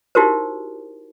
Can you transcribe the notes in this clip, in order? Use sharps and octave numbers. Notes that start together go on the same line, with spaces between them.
D#4 E4 F#4 G4 A#4 C5